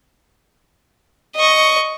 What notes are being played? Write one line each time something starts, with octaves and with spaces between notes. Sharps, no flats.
D#5 C#6